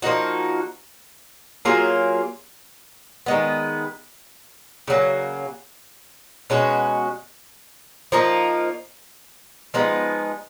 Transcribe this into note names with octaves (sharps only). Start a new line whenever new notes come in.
F3 A#3 D#4 F#4
F#3 A#3 F4 G#4
D#3 G#3 B3
C#3 F#3 A#3
B2 G#3 C#4 F#4
F3 A#3 D#4
F3 G#3 B3 D#4